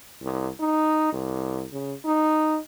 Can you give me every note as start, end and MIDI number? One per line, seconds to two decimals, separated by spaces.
0.21 0.48 36
0.60 1.11 63
1.13 1.65 36
1.72 1.93 49
2.05 2.59 63